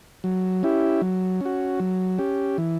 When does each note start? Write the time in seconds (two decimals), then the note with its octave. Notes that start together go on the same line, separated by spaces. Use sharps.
0.24 F#3
0.63 C#4 E4 G4
1.01 F#3
1.41 C#4 F#4
1.80 F#3
2.18 C#4 G4
2.58 E3